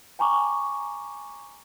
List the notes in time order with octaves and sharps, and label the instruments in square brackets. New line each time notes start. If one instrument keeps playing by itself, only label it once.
[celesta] G5 G#5 A#5 C#6 D6